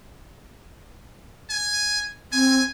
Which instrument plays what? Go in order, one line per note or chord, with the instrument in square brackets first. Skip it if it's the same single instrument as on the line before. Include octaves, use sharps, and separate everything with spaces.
[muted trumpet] G#5
[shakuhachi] C4 [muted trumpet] G#5